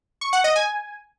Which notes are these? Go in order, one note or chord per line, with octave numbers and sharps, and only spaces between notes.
C#6
F#5
D#5
G#5